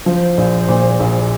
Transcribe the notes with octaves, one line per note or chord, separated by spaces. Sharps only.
F3 C5
A#1
A#2
A#1